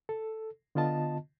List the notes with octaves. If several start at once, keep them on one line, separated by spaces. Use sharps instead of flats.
A4
D3 B3 F4 D#5 A5